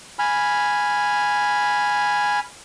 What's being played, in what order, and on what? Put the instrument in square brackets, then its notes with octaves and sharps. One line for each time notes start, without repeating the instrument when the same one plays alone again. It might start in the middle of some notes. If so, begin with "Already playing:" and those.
[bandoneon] G#5 B5 F6